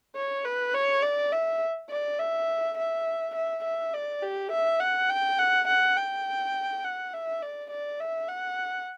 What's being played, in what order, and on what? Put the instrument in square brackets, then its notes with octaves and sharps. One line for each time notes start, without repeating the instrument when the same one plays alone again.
[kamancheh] C#5
B4
C#5
D5
E5
D5
E5
E5
E5
E5
D5
G4
E5
F#5
G5
F#5
F#5
G5
F#5
E5
D5
D5
E5
F#5